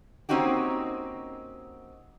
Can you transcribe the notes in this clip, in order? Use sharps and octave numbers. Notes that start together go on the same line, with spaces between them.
A#3 C4 C#4 D#4 F#4 G4